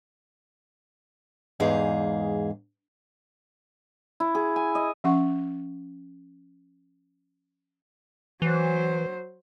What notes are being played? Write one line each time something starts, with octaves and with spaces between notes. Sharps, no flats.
E2 G#2 G#4 F5
E4
G#4
G#5
D#5
F3 C#4 F#5 C#6
E3 F#3 C5